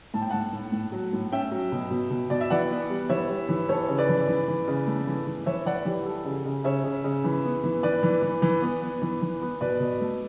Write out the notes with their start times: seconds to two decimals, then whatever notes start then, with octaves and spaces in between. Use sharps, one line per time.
0.14 A2 A5
0.22 G5
0.30 A2 F#5 A5
0.53 A2
0.72 A2
0.92 F#3
1.13 A2
1.32 C#4 E5 G5
1.51 F#3
1.72 B2
1.91 B2
2.10 B2
2.30 B2 D5
2.41 E5
2.50 E3 D5 F#5
2.71 B3
2.90 G3
3.09 E3 C#5 E5
3.29 G3
3.49 E3
3.69 E3 A4 C#5
3.88 C#3
3.98 B4 D5
4.09 E3
4.28 E3
4.48 E3
4.68 C#3
4.87 A3
5.07 E3
5.27 E3
5.46 E3 C#5 E5
5.65 E3 D5 F#5
5.85 E3 G4
6.05 G3 A4
6.25 C#3
6.45 C#3
6.64 C#3 C#5 E5
6.84 C#3
7.04 C#3
7.24 E3
7.44 B3
7.64 E3
7.83 E3 B4 D5
8.03 E3
8.22 E3
8.42 E3
8.62 B3
8.82 B3
9.02 E3
9.21 E3
9.41 B3
9.61 B2 B4 D5
9.80 B2
10.01 A3